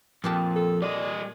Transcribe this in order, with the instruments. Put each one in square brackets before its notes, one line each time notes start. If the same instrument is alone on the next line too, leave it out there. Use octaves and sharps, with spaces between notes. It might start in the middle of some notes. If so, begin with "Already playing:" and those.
[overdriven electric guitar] F2 [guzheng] A#2 G4 A5
[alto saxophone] A4
[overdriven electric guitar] G3 D#5 [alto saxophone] D5